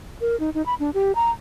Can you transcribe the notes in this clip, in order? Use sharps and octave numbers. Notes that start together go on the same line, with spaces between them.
A#4
D#4
D#4
B5
D4
G4
A#5